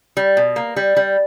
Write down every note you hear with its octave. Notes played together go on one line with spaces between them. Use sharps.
G3
B2
A#3
G3
G3